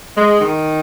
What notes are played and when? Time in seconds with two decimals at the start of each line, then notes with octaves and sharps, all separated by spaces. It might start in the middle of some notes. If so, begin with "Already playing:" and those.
0.16 G#3
0.40 D#3